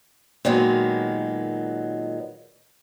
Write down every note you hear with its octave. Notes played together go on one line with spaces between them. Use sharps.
A#2 D#3 F#3 G#3 B3